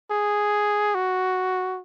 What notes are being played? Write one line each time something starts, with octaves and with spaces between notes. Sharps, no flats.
G#4
F#4